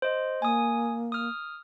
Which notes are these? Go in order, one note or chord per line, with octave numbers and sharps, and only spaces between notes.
C5 D#5
A#3 G#5 D#6
D#6 F6